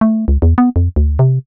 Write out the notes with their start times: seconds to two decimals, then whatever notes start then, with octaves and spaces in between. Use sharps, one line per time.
0.01 A3
0.28 C#2
0.42 E2
0.58 B3
0.76 F2
0.96 D2
1.19 C3